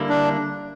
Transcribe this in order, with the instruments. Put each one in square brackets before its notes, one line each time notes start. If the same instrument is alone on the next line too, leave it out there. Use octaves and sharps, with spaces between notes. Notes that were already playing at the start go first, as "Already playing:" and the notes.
Already playing: [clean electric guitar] D3 G3 A#3 E4
[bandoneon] D4